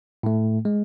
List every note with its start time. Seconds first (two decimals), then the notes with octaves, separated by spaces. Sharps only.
0.23 A2 A3
0.65 G#3